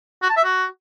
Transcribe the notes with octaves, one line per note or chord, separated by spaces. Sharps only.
F#4
A5
E5
F#4